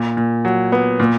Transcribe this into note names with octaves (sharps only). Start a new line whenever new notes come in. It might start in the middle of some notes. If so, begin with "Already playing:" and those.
Already playing: A#2
A#2
F#3
B3
A#2